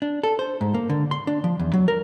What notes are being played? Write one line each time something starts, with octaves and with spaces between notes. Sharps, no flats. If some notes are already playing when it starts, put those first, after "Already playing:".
D4
A4
C5
G#2
A#3
D3
C6
D4
F3
E2
F#3
A#4